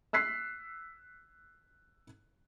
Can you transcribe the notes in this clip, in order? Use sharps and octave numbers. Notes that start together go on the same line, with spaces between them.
E6 F#6 B6 C7